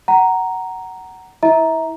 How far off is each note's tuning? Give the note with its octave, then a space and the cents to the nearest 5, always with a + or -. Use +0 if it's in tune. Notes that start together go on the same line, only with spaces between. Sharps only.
F#5 +15 A#5 +0
E4 -20 E5 -30 A#5 +5